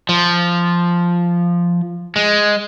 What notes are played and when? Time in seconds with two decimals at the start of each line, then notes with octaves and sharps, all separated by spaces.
0.09 F3
2.16 G#3